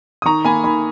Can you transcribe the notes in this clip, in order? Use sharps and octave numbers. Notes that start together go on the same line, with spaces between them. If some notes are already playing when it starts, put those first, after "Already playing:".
D#6
D#3 A#5 C#6
A#3 G#5 B5
D#3 G#5 B5